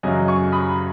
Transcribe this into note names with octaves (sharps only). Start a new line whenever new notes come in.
F#2 C#3 F#3 D#5 G#5
G#5 C#6
B5 D#6